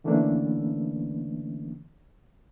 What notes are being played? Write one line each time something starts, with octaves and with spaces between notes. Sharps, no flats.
D3 E3 A3 A#3 C#4 D4